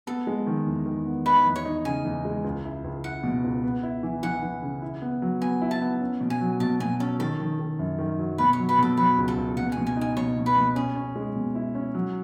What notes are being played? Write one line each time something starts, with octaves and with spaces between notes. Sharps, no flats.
B3 A4
G#3
D#3
E2
D#3
B3
D#4 B4
E2
C#5
D#4
C#3 G#5
E2
G#3
C#2
E4
C#2
E4 F#5
B2
C#2
B3
E4
E3
E3 F#5
E3
C#3
E4
B3
F#3
B3 G#5
E4
A5
B3
C#4
B2
G#5
F#3
B2 A5
B2 G#5
C#4 A4
D#3 A4
D#3
D#3
F#2
D#3
F#3
B2 B4
C#5
F#3
B4
B2 A4
F#3 B4
C#2
A4
C#2
B2 F#5
B2 G#5
G#5
D#4
G#5
B2 C#5
B2
B4
B2
C#4 G#4
C#4
G#3
B2
E4
C#4
F#3